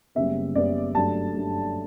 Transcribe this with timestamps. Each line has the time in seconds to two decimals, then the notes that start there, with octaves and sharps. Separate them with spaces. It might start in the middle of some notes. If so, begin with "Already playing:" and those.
0.15 F#1 F#2 C#3 G3 B3 E5
0.55 F#1 F#2 C#3 G3 B3 D5
0.95 G2 F#3 A3 A5
1.36 G2 F#3 A3